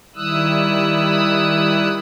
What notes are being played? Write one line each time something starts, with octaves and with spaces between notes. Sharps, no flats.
D#3 G3 E4 D#6 E6 F#6